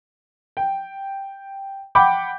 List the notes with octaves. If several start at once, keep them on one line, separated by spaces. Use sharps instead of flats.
G5
F#5 G5 B5 D6 G6